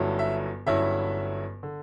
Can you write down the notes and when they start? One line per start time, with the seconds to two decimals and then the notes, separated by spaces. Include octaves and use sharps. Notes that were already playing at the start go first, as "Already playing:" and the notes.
Already playing: G1 G2 F#3 C#4 E4
0.19 E5
0.66 G1 G2 F#3 C#4 E4 E5
1.63 D3